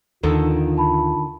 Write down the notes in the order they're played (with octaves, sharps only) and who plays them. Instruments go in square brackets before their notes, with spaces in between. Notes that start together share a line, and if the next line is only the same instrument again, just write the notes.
[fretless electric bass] D#2 [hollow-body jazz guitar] D3 D#3 A4 [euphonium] F4
[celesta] A5 B5